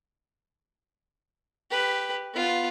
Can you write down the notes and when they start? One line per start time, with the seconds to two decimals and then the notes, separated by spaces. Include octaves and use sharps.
1.71 G4 B4
2.34 B3 F4